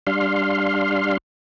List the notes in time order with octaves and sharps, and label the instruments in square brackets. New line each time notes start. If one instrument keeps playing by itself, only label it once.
[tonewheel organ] G3 D4 F5 C6